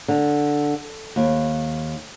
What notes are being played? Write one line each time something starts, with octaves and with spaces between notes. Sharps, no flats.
D3
D#2